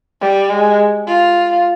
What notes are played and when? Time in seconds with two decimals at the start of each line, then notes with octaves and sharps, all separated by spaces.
0.21 G3
0.50 G#3
1.07 F4